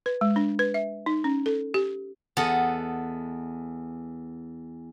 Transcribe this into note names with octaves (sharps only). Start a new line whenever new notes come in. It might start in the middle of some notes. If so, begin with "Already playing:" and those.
B4
G#3
D4
B4
E5
D#4
C#4
A4
G4
E2 A4 D#5 F#5